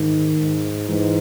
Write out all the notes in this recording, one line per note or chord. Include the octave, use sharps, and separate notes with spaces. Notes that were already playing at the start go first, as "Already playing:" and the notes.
Already playing: G#2 D#3
G#2
G#2 E3